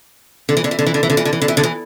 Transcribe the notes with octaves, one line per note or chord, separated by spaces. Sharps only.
D3
E3
D3
E3
D3
E3
D3
E3
D3
E3
D3
E3
D3
E3
D3
E3